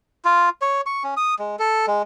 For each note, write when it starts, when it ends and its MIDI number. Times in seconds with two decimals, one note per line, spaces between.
0.25 0.49 65
0.62 0.81 73
0.86 1.03 85
1.04 1.14 61
1.17 1.34 87
1.39 1.56 56
1.59 1.86 69
1.87 2.02 56